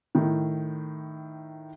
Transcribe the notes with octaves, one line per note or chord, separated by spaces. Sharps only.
A2 D#3